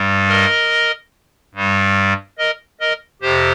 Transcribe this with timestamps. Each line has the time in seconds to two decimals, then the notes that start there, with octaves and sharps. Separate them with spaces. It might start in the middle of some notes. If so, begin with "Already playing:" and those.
Already playing: G2 G3
0.28 A#4 D#5
1.55 G2 G3
2.38 A#4 D#5
2.80 A#4 D#5
3.22 F2 C3 G4 C5